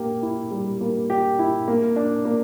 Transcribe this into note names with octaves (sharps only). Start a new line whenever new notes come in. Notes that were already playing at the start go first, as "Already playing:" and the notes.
Already playing: A#3 G4
E4
G3
A#3
G4
E4
A#3
D4
A#3